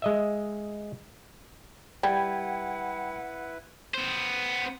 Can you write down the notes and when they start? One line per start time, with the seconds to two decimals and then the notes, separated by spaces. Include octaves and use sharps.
0.02 G#3 D#5 E5
2.03 G3 E4 B4 F#5 G5 B5 G#6
3.94 B3 C5